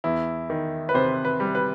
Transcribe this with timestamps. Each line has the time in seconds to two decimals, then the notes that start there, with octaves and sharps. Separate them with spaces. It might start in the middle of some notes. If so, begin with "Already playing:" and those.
0.04 E2 E4
0.50 D#3
0.89 B4
0.94 C3 C5
1.25 B4
1.40 G3
1.55 B4